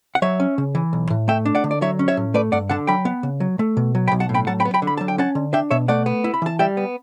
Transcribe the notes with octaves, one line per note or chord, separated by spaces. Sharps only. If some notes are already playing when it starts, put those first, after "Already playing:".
F#5
F#3 C#5 E5
C#4
C#3
E3
B1
A2
A3 E5 G5
D4
D5 F#5
D3
D5
F#3 C#5 E5
C#4
C#5 E5
A2
A3 B4 D5
G2 D5 F#5
D3 F#5 A5
F#3 G5 B5
B3
C#3
F#3
A3
B2
F#3
G5 B5
B1
F#5 A5
A2
G5 B5
F#3 F#5 A5
G5 B5
B3
G5 B5
D3
B5
F#3 A5
G5
C#4 F#5 A5
D3
D4 E5 G5
B2 C#5 E5
A3 D5 F#5
B3
E4
B5
E3 A5
G3 E5 G5
B3